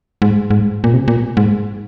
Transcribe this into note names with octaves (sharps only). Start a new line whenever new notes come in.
G#2
G#2
A#2
C3
A#2
G#2